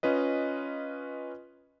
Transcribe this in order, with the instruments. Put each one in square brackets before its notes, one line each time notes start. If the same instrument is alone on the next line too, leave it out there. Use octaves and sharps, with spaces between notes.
[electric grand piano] C#4 F4 B4 D#5